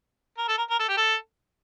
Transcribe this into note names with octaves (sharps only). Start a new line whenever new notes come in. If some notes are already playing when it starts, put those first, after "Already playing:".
A#4
A4
A#4
A#4
A4
G4
A4